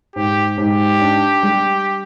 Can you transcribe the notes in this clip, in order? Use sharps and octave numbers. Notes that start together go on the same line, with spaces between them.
G#2 G4
G#2 G4
D4
G3